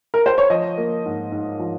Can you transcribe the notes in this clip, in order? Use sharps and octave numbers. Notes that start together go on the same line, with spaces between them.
A#4
C5
C#5
F3 D#5
A#3
G#2
G#2
F3